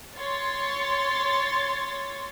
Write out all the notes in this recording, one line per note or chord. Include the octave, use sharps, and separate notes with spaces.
C#5 C6 A6